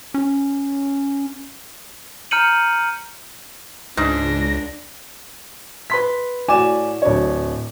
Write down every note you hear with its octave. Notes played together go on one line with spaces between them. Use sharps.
C#4
A#5 F6 G6 C#7 D#7 F#7
C#2 G#2 D4 A#6
B4 C6 B6
A2 F#4 D5 G#5 D6 E7
D1 D4 C#5